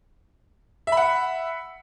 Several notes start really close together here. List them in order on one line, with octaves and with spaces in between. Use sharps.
E5 B5 F#5